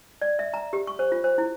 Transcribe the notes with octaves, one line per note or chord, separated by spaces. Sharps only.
D5
E5
A#5
G4
C#6
C5
F4
C5
E4